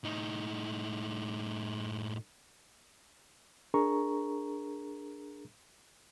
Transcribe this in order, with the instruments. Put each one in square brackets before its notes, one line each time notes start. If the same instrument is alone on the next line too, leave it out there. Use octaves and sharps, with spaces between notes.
[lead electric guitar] A2 D#4
[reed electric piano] D4 G#4 A#4 A#5 C#6